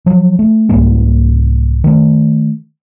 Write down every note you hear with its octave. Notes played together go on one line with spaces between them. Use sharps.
F3 F#3
A3
C2 G#2 G3 A#3
D#3 A3